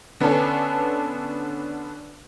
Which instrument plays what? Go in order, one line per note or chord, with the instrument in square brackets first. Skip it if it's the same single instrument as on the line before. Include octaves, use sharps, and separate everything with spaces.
[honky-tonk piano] D3 B3 C#4 D4 A4